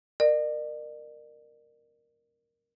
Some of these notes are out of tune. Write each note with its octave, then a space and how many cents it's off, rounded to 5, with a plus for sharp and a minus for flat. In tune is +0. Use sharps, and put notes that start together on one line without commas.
A#4 +0 D5 +45